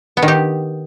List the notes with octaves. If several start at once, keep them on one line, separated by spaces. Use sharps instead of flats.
B3
D#3
G4